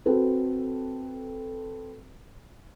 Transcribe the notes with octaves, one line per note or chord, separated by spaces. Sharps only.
C4 F#4 A4 B4